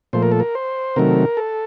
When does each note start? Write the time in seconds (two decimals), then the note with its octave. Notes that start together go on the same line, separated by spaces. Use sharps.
0.13 A#2 F3 A3 C5
0.22 A#4
0.32 A4
0.40 A#4
0.55 C5
0.96 C3 D#3 F#3 A3 A#4
1.37 A4